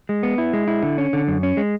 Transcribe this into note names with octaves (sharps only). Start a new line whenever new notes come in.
G#3
B3
E4
G#3
E4
D3
C#4
D3
F#2
C#4
G#3